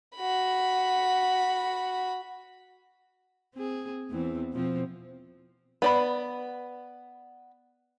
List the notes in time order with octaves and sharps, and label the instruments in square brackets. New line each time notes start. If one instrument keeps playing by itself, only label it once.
[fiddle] F#4 B5
[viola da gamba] C4 G#4
E2 E3 C4
B2 F3 C4
[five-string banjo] B3 D5 B5